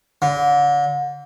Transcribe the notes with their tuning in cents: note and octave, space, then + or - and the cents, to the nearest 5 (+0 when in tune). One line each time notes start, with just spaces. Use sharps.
D3 -30